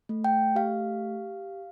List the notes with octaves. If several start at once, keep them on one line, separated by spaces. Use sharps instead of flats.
A3
G5
G4 F5